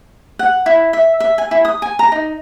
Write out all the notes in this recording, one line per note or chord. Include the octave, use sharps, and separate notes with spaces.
F#5
E4
E5
E5
G#5
E4
D#6
G#5
A#5
D#4